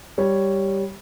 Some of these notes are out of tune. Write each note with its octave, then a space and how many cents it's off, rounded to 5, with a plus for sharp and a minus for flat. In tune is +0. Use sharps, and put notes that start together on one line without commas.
G3 +0 C#5 +0